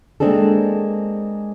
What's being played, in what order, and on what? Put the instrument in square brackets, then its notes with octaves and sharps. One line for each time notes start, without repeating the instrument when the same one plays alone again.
[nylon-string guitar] G#3 A#3 C4 D4 G#4 A4